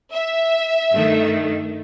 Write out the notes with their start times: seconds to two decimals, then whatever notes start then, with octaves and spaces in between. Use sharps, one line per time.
0.13 E5
0.92 G2 D#3 A3